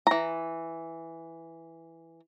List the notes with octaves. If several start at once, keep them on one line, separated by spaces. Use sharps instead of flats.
E3 A#5